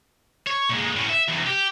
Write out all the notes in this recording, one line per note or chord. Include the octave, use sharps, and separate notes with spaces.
C#5
A#2 G#3
A2 C#4
E5
E2 C3
G4